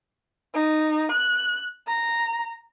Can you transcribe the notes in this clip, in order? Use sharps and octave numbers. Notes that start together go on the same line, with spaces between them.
D#4
F#6
A#5